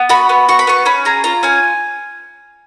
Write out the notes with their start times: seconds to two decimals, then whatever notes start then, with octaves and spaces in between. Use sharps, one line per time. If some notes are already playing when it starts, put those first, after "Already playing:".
Already playing: B3
0.09 F#4 B5
0.29 B3
0.49 F#4 C#6
0.59 B5
0.67 B3 C#6
0.86 C#4 B5
1.05 G#4 A#5
1.24 F4 A#5
1.43 C#4 G#5